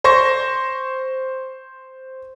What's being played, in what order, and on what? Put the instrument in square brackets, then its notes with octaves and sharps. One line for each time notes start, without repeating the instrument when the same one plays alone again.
[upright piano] C5 C6 C#6 A#6